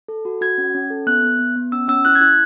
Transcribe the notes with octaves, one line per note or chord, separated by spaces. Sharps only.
A4
F#4
F#4 G#6
C#4
C#4
A4
B3 F#6
B3
B3
B3
C#4 E6
C#4 E6
E4 F#6
G#6
E4 F#6